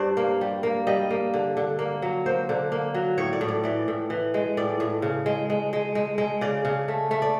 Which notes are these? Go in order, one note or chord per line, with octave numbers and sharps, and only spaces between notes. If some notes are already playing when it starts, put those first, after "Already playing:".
Already playing: G2 G4 C5 D5
A#3
G3
A#3
G3 D#5
A#3
D3
D3
A#3
F#3
A#3 C5
D3
A#3
F#3
A2 C#5
D5
A2
D5
E3 D5
A2
E3
G#3
A2 D5
A2
C#3
G#3
G#3
G#3
G#3
G#3
C#3 D5
C#3
A3
A3
D5